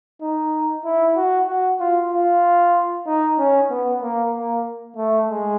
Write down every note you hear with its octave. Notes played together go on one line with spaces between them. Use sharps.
D#4
E4
F#4
F#4
F4
F4
D#4
C#4
B3
A#3
A#3
A3
G#3